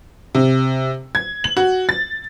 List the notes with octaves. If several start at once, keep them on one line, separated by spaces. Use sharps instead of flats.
C3
G#6
F#7
F#4
A6